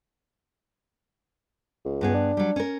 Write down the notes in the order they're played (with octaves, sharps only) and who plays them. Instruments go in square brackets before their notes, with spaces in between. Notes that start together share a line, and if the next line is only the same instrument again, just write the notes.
[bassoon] C#2
[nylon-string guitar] G2 B3 G#4
[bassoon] D4
[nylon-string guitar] F#3 G3
C#4 A#4